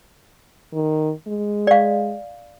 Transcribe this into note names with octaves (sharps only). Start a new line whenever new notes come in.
D#3
G#3
D5 F5